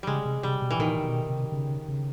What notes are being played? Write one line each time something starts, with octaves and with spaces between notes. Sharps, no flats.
C#3 G3 G#3
C3
C3 G3
B2
E3
A#2 D#3
B2
C3
C#3
C#3